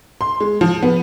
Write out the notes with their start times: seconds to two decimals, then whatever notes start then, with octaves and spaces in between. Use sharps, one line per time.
0.21 C6
0.40 G#3
0.61 F3
0.83 B3